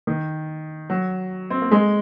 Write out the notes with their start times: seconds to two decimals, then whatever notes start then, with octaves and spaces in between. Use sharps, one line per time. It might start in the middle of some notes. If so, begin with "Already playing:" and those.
0.07 D#3
0.90 F#3
1.50 C4
1.62 A#3
1.72 G#3